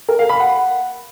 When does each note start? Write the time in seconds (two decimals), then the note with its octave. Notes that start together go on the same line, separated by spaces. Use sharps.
0.09 A#4
0.19 F5
0.29 B5
0.40 F#5